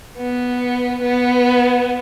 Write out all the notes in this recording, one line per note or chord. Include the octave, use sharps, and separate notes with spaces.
B3
B3